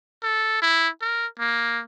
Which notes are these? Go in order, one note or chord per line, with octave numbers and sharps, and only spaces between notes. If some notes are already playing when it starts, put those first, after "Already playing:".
A4
E4
A#4
A#3